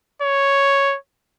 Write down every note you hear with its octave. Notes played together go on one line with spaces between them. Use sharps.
C#5